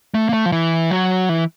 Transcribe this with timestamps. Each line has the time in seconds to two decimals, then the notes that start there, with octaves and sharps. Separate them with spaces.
0.14 A3
0.29 A#3
0.33 A3
0.46 F3
0.52 E3
0.91 F#3
1.29 E3